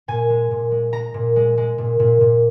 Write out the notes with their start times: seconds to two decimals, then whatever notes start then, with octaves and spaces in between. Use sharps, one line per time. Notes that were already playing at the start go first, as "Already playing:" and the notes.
0.08 A#2 G#5
0.30 G#3
0.51 A#2
0.71 G#3
0.93 G#3 A#5
1.14 A#2
1.36 G#3
1.58 G#3
1.78 A#2
1.99 A#2
2.21 A#2